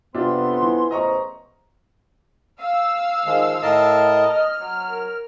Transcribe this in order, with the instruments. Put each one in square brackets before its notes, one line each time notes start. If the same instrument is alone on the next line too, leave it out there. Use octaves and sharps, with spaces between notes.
[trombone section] F2 B3 [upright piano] C3 D4 F4 [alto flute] C6
[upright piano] E3
[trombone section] A1 E2 C5 [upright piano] D#5 A#5 C#6
[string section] F5 E6
[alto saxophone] D#3 [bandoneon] F3 G#3
[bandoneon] A2 A#4 A5 [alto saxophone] D#5
[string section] F6
[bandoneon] F#3
[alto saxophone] A#4